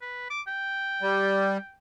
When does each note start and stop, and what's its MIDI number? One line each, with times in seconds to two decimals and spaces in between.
0.01 0.27 71
0.30 0.41 86
0.47 1.76 79
1.02 1.58 55